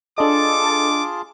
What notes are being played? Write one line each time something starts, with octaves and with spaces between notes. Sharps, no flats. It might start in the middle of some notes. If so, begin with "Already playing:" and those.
D4 F4 G#4 A4 D#5 A5 D6